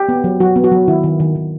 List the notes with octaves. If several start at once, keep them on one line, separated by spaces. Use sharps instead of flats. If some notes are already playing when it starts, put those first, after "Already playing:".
Already playing: G4
B3
F#3
F#3 F#4
B3
F#4
F#3
D#3 E4
D#3
D#3
D#3